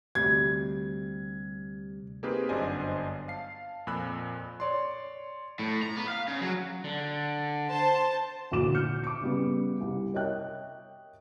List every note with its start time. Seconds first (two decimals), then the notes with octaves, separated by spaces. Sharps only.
0.15 D2 C3 G3 G#6
2.23 A#3 C4 D#4 G4 G#4 B4
2.49 G1 F#2 D4 C5 D#5 G#5
3.28 F5 A5 C7
3.87 F2 A#2 G#5 B5 E6 F#6
4.60 C#5 D5 C6
5.59 A2
5.82 A#5
5.96 B3
6.08 F5
6.28 C#3
6.42 F#3
6.84 D3
7.71 C5 A5
8.51 A1 D2 A#2 F#4 D6 E7
8.74 F6 G6 C#7
9.04 D6 C#7
9.21 C#3 G3 B3
9.81 C2
10.14 A#4 C#5 D#5 E5 G5 F#6